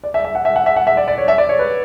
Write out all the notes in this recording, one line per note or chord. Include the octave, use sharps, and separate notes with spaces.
D5
E5
E5
F#5
E5
F#5
E5
F#5
E5
D5
D5
C#5
E5
D5
C#5
B4